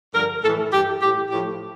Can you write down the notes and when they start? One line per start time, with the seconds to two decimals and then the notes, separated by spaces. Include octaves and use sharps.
0.13 G2 D3 F3 A#4
0.43 A2 E3 A4
0.72 G2 E3 G4
1.01 A2 E3 G4
1.30 A2 F3 G4